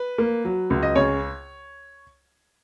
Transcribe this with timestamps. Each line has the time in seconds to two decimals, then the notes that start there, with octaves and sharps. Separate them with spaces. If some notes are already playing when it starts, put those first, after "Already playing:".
Already playing: B4
0.18 A#3
0.45 F#3
0.70 C#2
0.83 D#5
0.96 C#3 C#5